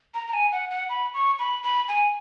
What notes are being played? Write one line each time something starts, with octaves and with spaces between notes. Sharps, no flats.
A#5
A#5
G#5
F#5
F#5
B5
C#6
B5
B5
G#5